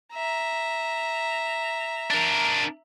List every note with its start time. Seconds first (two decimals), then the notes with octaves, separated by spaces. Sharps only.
0.13 E5 A#5
2.10 D4 A#4